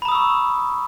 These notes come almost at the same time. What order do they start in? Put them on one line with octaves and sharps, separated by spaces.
B5 A#5 D#6 E6 C#6